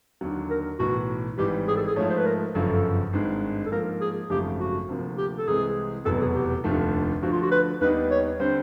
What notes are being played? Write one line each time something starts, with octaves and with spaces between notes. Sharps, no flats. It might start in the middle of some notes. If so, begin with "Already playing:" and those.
D#2 D3 F#3
A#4
B1 A2 E3 F#4
G#1 G#2 E3 G3 G4
G#4
A4
G#4
G#2 F3 A3 C#5
C5
B4
A#4
G1 F#2 C#3 F3 A4
G#1 G2 D#3 G#3
A4
G#2 F3 A#3 A#4
G#4
G#1 F#2 C#3 F3 A3 G4
F#4
D2 C3 F3 A#3
G4
A4
C2 C3 E3 G#3 G#4
F1 E2 B2 F#3 B3 A4
G#4
G4
F1 D#2 D3 F3 A3
D2 D3 F3 F#4
F4
F#4
B4
D#2 D#3 G3 B3 D#4 B4
C#5
D3 G3 C4 C5